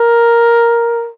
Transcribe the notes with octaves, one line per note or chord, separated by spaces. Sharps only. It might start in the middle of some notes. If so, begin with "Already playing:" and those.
Already playing: A#4